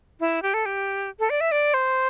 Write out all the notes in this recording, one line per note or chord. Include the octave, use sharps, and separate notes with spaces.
E4
G4
A4
G4
A4
D5
E5
D5
C5